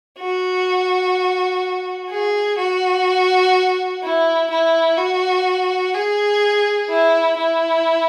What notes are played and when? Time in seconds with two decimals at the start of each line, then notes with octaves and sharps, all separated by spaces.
0.19 F#4
2.10 G#4
2.58 F#4
4.03 E4
4.51 E4
4.98 F#4
5.95 G#4
6.90 E4
7.38 E4